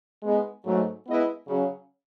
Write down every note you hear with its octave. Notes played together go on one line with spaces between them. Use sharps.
G#3 B3 D#4
G#2 F#3 A3
G#3 B3 E4 B4 D#5
C#3 F#3 C#4